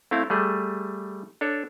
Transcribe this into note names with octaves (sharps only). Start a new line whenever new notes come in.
A3 C4 E4 F5
G3 A3 G#4
D4 A4 C#5